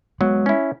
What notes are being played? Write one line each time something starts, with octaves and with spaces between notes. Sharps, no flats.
F#3 G#3 B3
C#4 E4